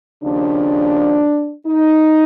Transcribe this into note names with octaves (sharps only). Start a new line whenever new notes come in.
D#2 C#3 F3 D4
D#4